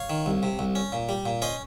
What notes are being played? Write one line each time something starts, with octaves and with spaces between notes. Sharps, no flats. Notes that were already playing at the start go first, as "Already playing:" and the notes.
Already playing: C#5 F5
D#3
C2
C3
C2
C#4
A#2
G3
A#2
C#4 C5 D#5